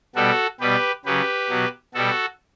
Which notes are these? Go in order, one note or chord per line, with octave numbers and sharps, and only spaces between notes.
B2 G3 F#4 A4
B2 G3 G4 B4
C#3 F#3 G4 B4
B2 F#3
B2 G3 F#4 A4